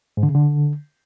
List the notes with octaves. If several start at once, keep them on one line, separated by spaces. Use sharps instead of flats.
G#2
D3
C#3
D3